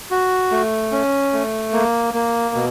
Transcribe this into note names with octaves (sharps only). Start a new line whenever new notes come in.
F#4
A3
C#4
A3
A#3
A#3
B2